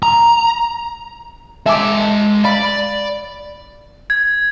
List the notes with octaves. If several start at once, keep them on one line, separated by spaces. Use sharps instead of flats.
A#5
G#3 E5 G#5 A5 D6
D5 F5 B5
G#6